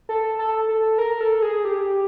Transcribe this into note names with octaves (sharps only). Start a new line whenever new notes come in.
A4
A4
A4
A#4
A4
G#4
G4